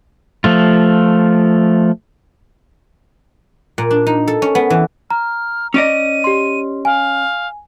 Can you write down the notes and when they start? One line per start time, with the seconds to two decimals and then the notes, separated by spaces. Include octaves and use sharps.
0.44 F3 A3 F4
3.78 A#2
3.91 D4
4.07 D#4
4.27 A4
4.42 C#4
4.55 B3
4.70 E3
5.10 A#5 F6
5.74 C#4 D5 D#5 D#7
6.24 G4 C6
6.85 F5 G#5